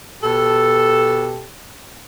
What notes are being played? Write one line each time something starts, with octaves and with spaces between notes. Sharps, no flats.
B2 G4 A4